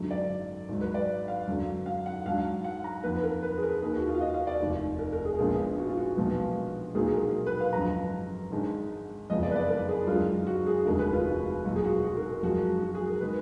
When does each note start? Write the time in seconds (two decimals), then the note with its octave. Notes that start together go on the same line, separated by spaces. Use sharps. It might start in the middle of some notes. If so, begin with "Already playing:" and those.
Already playing: G#1 F#2 D3 F#3
0.11 D5
0.69 G#1 G#2 F#3
0.81 B4
0.94 D5
1.28 F5
1.47 F#2 D3 F#3
1.86 F5
2.06 F#5
2.26 G#2 F#3 D4 F5
2.64 F#5
2.84 A#5
3.03 F2 D#3 A#3 B4
3.23 A#4
3.42 B4
3.58 G#4
3.63 A#4
3.81 D#2 D#3 A#3 D#4 G#4
3.95 F#4
4.08 F4
4.15 F5
4.21 D#5
4.34 F5
4.47 D5
4.60 F1 D#2 D#3
4.99 A#4
5.13 A#4
5.25 G#4
5.38 A#1 A#2 G#3 B3 D4 G#4
5.78 F#4
5.89 F4
5.97 F#4
6.16 B1 A#2 F3 B3
6.95 B1 A#2 F#3 A#3 D#4 G#4
7.07 G#4
7.14 A#4
7.46 B4
7.60 F5
7.73 G#1 F#2 D3 F3 A#5
8.51 G#1 G#2 D#3 G#3 D4
9.30 F#1 F2 F3 G#3 B3 D#5
9.43 D5
9.51 B4
9.56 D5
9.68 A#4
9.88 G#4
10.07 F#2 D3 G#3 D#4 F4
10.47 F#4
10.67 G#4
10.86 F1 D#2 D3 G#3 A#4
10.99 B4
11.13 F4
11.26 F#4
11.64 B1 A#2 F#3 F#4
11.76 G#4
11.84 F#4
12.03 F#4
12.17 A#4
12.29 A#4
12.43 F#2 F3 G#3 F#4
12.82 F#4
12.95 G#4
13.08 A#4
13.20 D#3 G#3 B4